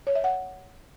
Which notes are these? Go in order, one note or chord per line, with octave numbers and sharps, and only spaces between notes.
C#5
E5
F#5